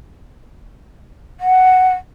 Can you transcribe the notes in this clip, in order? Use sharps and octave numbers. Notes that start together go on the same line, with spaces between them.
F#5